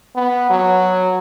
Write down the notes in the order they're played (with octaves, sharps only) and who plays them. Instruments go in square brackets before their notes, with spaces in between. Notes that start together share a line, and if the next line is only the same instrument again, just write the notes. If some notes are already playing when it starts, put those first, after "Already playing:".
[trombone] B3
F#3